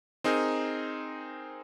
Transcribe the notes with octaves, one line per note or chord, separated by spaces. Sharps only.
C4 D#4 G#4 A#4